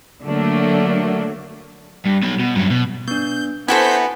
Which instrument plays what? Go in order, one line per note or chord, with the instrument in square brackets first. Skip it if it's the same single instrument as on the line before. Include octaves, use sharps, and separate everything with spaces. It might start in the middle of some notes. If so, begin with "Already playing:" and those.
[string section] D3 F#3 A3 A#3 D4
[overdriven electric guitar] G2
B2 F#3
B2
G2 F#3
B2
[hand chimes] B3 D4 [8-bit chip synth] G6
[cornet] B3 [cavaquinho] E4 F#4 A4 [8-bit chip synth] C5 G6 B6 [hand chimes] G#5